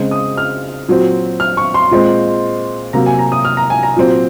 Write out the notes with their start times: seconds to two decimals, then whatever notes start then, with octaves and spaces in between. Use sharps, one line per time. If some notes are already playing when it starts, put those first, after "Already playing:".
Already playing: C#3 G#3 C4
0.11 D#6
0.38 F6
0.88 A#2 F#3 C4
1.40 F6
1.57 C#6
1.74 C6
1.91 A#2 G#3 C4
2.93 C3 F#3 A#3 A#5
3.06 G#5
3.19 A#5
3.32 D#6
3.45 F6
3.57 A#5
3.70 G#5
3.83 A#5
3.96 A#2 F#3 C4